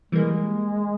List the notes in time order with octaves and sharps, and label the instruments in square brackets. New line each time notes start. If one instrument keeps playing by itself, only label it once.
[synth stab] E3 G3 A#3 [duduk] G#3